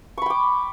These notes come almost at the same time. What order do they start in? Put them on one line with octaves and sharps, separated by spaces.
C#6 B5 G5 D6